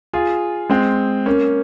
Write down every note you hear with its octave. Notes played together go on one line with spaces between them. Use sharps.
F4 G#4
G#3 C4
A#3 C#4